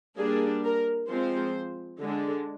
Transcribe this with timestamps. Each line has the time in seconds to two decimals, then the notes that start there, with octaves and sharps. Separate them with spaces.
0.18 G3 A#3 D4 G#4
0.64 A#4
1.09 F3 G#3 C4 C5
2.00 D3 G#3 D4